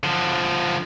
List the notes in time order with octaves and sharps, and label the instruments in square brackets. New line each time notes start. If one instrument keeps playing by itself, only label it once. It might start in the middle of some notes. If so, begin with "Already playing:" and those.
[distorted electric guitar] D3 F3